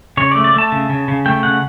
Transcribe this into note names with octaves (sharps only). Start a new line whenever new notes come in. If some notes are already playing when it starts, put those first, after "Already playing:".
C#3 C#5
D5
A3
D5
A3 A5
C#3
C#3
C#3
A3 G5
C#3 F#5